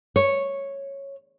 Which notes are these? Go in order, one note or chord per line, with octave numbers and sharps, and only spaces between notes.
C#5